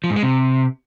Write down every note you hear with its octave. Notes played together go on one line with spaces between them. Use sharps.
F3
G#2
G#3
C3